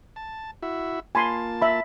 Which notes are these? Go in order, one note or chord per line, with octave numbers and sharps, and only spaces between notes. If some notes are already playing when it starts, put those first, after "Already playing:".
A5
E4 F#4 E5
A#3 F4 G#5 A5 B5 C6
E5 B5